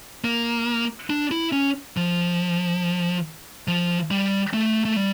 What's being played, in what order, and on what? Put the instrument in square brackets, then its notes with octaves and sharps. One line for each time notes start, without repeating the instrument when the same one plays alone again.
[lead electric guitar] A#3
D4
E4
C#4
F3
F3
G3
A3
A3
G3